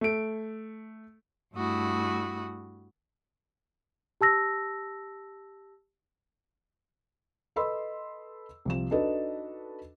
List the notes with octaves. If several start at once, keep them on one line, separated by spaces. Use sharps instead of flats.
A3 D7
G2 A3 E4 F#4 D#6
G4 A5 E6 A#6
A4 B4 D#5 B5 C6 E6
C2 F3 E7
D4 D#4 F#4 A4 B4 D#5